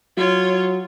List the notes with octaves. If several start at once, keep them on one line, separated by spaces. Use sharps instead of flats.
F#3 F4 C#5